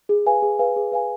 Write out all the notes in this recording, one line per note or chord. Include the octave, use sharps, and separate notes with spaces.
G#4
B4 F5 G#5
G#4
B4 F5 G#5
G#4
B4 F5 G#5